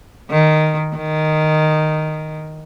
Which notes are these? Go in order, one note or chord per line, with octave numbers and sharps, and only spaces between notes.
D#3
D#3